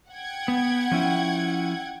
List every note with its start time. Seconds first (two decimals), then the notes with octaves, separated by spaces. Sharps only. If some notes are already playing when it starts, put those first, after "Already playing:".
0.12 F#5 G5 G#6
0.48 B3
0.91 F3 C#4 E4